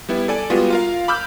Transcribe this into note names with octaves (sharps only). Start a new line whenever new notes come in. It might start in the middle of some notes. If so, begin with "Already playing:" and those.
G3 B3 E4
A4 D5 G#5
G3 G#3 B3 F4 F#4
F4 A#4 F5
B5 D6 E6 F6 G6